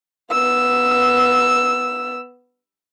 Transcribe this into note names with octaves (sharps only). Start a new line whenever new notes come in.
B3 E6